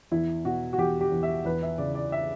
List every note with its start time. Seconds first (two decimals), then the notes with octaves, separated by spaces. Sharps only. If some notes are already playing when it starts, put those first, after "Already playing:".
0.12 E2 E4
0.45 B2 F#4
0.73 F#4
0.78 E2 G4
1.01 G4
1.12 E2
1.23 E5
1.45 E2 B4
1.63 E5
1.78 C#3 D5
1.95 D5
2.12 E5